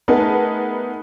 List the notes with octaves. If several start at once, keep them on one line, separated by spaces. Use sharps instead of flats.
A3 B3 D#4 G#4 A#4 B4